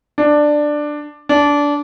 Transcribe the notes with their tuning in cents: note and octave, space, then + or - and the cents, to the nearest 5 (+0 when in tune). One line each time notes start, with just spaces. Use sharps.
D4 +10
D4 -20